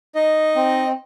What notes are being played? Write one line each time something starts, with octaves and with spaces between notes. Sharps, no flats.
D#4 D#5
C4